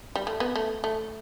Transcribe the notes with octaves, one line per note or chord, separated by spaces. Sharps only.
G3
A3
B3
A3
A3